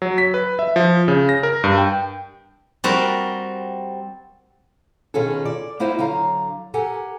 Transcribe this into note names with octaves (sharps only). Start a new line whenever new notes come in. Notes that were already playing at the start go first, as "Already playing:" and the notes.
F#3
B6
B4
E5
F3
C#3
A#6
A#4
G2
G5
G3 C4 F#4 A#4
B2 D#3 C#4 F4 G#4 A4
D5
A#3 B3 E4 F4 C5 D#5
D3 F#3 F5 A#5
G4 A4 A#4 F#5 G#5